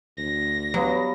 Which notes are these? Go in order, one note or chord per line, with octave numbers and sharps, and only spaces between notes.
D2 A#6
F#3 G3 B3 F5